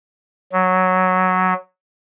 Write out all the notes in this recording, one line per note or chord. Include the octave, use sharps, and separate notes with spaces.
F#3